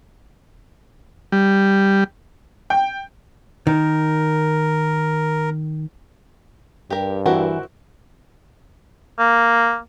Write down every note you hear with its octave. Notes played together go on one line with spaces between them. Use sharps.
G3
G5
D#3 A#4
G2 G4 A#4
E3 C4 E4 F#4 A#4
A#3